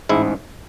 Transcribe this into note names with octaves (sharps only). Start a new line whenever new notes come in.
A1 G#2 G#3 E4